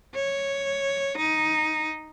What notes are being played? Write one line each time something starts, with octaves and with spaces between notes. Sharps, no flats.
C#5
D#4